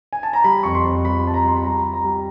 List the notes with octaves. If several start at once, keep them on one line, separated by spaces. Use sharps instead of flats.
G#5
A5
A#5
G3 B5
F2 C#6
C6
F2
G3 B5
G3 A5
A#5
G3 C6
B5
G3 A#5
G3
A#5
G3